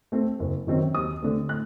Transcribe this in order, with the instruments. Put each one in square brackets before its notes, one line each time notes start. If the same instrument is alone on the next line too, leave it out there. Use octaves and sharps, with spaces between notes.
[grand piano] A3 C4
F#1
F#2 D#3 F#3 C4
D#2 D#6
D3 A3 C4
A2 F#6